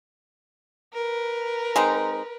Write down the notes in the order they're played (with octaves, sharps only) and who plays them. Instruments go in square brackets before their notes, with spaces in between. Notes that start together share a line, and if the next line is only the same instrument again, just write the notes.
[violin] A#4 B4
[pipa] G#3 C4 D#4